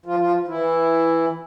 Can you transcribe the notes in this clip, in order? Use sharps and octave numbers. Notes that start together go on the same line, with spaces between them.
F3 F4
F3 F4
E3 E4